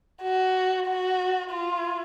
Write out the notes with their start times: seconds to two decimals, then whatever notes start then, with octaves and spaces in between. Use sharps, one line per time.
0.23 F#4
0.87 F#4
1.51 F4